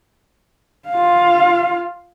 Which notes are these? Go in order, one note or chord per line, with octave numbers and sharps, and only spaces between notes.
F4 F5